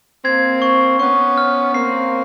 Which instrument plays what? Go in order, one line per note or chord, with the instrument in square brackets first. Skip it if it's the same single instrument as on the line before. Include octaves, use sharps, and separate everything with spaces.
[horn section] A#3 C4 [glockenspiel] G#6
[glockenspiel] C#6
[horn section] B3 C#4 [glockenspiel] C#6
[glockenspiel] F6
[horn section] A#3 C4 [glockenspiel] C7